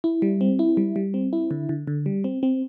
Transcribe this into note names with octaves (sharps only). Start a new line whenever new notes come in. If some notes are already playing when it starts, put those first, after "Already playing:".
E4
G3
C4
E4
G3
G3
C4
E4
D3
D3
D3
G3
C4
C4